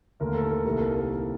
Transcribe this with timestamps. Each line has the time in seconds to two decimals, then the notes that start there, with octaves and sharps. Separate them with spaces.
0.20 D#2 D3 A3 A#4
0.35 A4
0.50 A#4
0.64 C2 C3 D#3 G3 A#3 A4
0.80 A#4